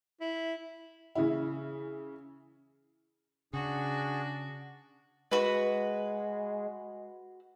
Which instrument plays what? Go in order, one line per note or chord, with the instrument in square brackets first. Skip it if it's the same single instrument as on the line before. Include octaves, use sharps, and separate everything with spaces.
[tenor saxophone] E4
[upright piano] C#3 E3 E4
[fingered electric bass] C#3 [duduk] D4 [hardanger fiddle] F#4 [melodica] G#4
[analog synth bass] G#3 [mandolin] F#4 B4